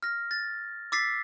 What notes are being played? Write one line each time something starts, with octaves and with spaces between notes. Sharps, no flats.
F6 A#6
A6
D6 E6 A6 B6 C7